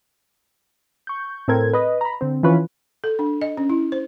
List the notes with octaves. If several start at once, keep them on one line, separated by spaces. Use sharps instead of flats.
C#6 G6
A2 C4 A4 A#4 G#6
B4 D#5
A#5 B5
D3 C4
E3 F3 C#4 F4 B4 C#5
A4
D4
D#5
C#4
E4
C5